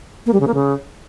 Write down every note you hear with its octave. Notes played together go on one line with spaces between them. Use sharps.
A#3
G3
C#3
A#3
C#3